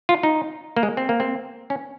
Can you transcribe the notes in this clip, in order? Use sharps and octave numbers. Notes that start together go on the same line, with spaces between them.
F4
D#4
A#3
G#3
C4
A#3
C4
C#4